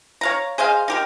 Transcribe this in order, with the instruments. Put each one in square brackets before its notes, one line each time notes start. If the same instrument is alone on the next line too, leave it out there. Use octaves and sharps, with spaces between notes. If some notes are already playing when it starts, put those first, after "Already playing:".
[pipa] C#5 F5 A#5
G#4 C5 D#5 F5
D#4 G4 A#4